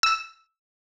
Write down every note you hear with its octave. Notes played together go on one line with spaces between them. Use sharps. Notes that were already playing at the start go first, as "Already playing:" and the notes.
E6